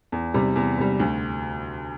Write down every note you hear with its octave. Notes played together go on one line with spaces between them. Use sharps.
E2
C3 G3
E2
C3 G3
D2